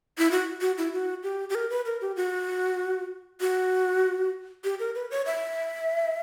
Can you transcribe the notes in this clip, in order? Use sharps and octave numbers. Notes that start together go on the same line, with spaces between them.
E4
F#4
F#4
E4
F#4
G4
G4
A#4
B4
A#4
G4
F#4
F#4
G4
A#4
B4
C#5
E5